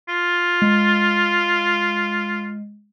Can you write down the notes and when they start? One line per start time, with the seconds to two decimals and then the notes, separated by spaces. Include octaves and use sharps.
0.09 F4
0.62 G#3